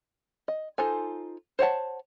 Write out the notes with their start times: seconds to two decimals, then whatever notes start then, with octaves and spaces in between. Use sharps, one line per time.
0.48 D#5
0.78 D#4 F4 A4 C5 G#5
1.59 C5 C#5 F#5 A5